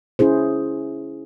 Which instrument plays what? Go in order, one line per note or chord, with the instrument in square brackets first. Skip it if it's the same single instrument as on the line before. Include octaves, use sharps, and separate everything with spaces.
[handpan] C#4 E4 G#4 C5